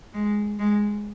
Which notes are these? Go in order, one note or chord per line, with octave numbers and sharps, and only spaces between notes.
G#3
G#3